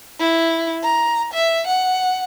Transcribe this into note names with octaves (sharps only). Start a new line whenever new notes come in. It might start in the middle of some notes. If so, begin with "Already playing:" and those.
E4
A#5
E5
F#5